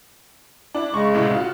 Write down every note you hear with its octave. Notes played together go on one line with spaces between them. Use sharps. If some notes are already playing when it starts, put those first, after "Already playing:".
D4 E4
C#3 G#3 C#6
C2 A2 C3
F4 F#4